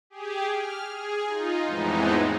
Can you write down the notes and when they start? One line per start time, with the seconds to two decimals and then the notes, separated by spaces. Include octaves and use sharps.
0.10 G4 G#4
0.53 F6
0.91 G#4
1.25 D#4 F4
1.64 F2 A2 E3 G#3 B3 D#4